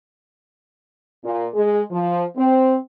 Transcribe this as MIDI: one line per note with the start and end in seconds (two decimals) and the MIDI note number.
1.24 1.46 46
1.54 1.81 56
1.90 2.25 53
2.37 2.76 60